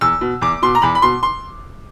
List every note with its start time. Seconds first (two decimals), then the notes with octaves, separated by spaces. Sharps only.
0.01 E2 E6
0.21 B2
0.42 E2 D6
0.62 B2 C6
0.75 A#5
0.82 E2 B5
0.95 B5
1.02 B2 C6
1.23 C6